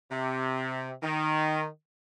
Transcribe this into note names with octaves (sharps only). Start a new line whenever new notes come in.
C3
D#3